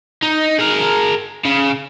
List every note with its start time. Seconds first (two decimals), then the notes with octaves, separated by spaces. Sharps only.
0.23 D#4
0.59 G#4 A#4
1.45 C#3